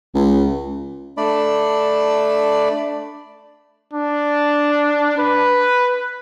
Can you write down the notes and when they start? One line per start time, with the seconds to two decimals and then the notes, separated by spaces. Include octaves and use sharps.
0.15 C#2
1.17 A3 D4 D5 B5
3.93 D4
5.18 B4